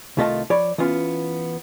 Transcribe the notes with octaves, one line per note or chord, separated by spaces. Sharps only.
C2 D#3 A3 F4 D#5 A5
F3 C#5 D5 B5
E3 B3 C#4 F4